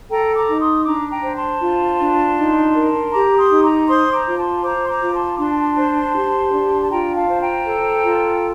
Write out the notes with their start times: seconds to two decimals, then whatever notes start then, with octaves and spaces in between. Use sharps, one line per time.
0.10 A4 G5 A#5
0.35 A#5 D6
0.48 D#4
0.61 C6 D#6
0.85 D4 A#5 D6
1.11 G5 A#5
1.23 C5
1.36 A5 C6
1.61 F4
2.00 D4
2.37 D#4
2.75 A#4
3.12 G4 A#5 D6
3.38 C6 D#6
3.51 D#4
3.63 A#5 D6
3.88 C5 C6 D#6
4.13 A#5 D6
4.26 F4
4.38 A5 C6
4.63 C5 A#5 D6
4.84 C6
4.88 A#5 D6
5.02 F4
5.14 A5 C6
5.36 D6
5.39 D4 A5 C6
5.77 C5
6.15 G4
6.52 D4
6.82 A5
6.90 F4 G5 A#5
7.15 F5 A5
7.29 C5
7.41 G5 A#5
7.65 A4
8.03 F4